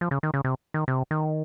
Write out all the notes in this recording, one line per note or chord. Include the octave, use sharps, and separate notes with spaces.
F3
C#3
D#3
C#3
C3
D#3
C3
D#3